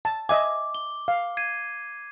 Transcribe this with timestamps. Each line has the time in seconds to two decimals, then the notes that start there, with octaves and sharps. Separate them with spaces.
0.05 A5
0.29 D#5 E5 G#5 D6
0.75 G7
1.08 F5
1.37 G#6 C7 D#7